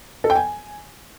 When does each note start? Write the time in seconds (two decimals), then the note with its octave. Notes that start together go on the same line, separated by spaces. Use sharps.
0.24 A4
0.30 G5
0.35 G#5